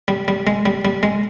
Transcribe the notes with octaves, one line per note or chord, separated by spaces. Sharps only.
G3
G3
G#3
G3
G3
G#3